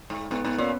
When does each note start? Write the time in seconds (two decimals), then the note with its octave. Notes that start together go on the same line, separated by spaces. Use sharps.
0.10 G#2
0.31 G#2 B3
0.44 G#2 B3
0.58 A#2 C#4